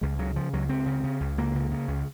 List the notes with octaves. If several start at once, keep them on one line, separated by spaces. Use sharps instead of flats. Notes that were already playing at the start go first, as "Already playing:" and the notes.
C#2 G#3
C#3 F#3
C#3 F3
C#2 F#3
C#2 C4
C#3
C#3
C#2
C#2 A#3
C#3
C#3
C#2